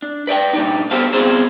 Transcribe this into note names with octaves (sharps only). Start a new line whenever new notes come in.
D4
B4 D5 D#5 G5
A#2 G3 D4 D#4
B3 D4 G4 A4 C5 F5
C2 B3 C4 F4 G#4 C5